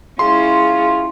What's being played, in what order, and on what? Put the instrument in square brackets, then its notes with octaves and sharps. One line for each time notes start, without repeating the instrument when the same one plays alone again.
[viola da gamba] G#3 C#4 E4 [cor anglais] F4 [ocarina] G#4 [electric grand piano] C6